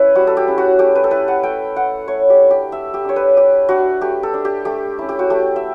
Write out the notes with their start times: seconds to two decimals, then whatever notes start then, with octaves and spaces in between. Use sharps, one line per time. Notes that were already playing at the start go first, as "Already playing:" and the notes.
Already playing: C#4 E4 B4 C#5
0.15 G3 F#4
0.27 A4
0.37 G4
0.48 C#4 E4
0.58 F#4
0.79 A3 G4
0.95 B4
1.04 A4
1.11 E4 B4
1.28 F#5
1.43 A3 G5
1.76 E4 F#5
2.08 A3 C#5
2.30 G4
2.40 D4
2.51 G4
2.72 A3 E5
2.94 G4
3.05 D4 C#5
3.16 B4
3.37 A3 G4
3.69 D4 F#4
4.01 A3 G4
4.23 A4
4.34 D4
4.45 G4
4.65 A3 G4
4.99 C#4 E4
5.09 G4
5.19 F#4
5.30 A3 G4
5.56 E5